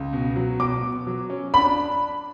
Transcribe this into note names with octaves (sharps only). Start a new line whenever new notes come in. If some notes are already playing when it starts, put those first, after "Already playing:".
Already playing: C#2
B2
F#3
B2 D6
B2
F#3
C#4
D4 B5